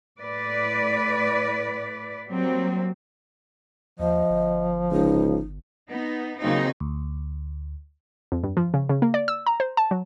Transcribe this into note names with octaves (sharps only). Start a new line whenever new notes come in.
A2 B4 D5
F#3 G3 A#3 C4
D#2 F3 D#5
G1
C#2 D#4
B3 D#4
D#2 C#3 F#3 C4 D#4
D2
F2
G2
F3
C#3
C#3
A#3
D5
E6
A#5
C5
A5
F#3